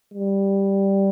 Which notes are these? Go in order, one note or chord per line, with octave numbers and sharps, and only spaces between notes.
G3